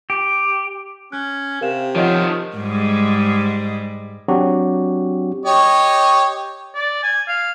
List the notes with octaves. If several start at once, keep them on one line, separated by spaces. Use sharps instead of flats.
G4
C#4 F#6
C3 A#4 F5 E7
D#3 F3 F4 C#5 D#5 F#5
G#2 G3 G#3
F#3 C4 D4 F#4 G4
G4 C#5 D#5
D5
G#5
F5